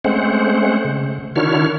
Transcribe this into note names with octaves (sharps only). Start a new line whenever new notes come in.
G#3 A3 C4 C#4 C5 F#5
C#3
D#3 D4 E4 F#4 C#5 F6